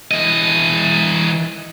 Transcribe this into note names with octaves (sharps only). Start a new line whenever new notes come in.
E3 D#5